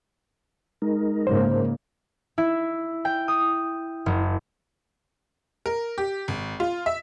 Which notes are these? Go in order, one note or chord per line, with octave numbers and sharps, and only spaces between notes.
G#3 D#4 A#4
G#2 C#3 A#3 C5
E4
G5
D#6
F#1
A#4
G4
G#1
F4
E5